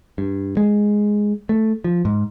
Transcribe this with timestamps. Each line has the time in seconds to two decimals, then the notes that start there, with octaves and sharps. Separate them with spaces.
0.18 G2
0.57 G#3
1.49 A3
1.84 F3
2.05 G#2